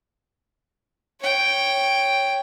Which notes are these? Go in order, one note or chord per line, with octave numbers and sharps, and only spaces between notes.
C#5 G5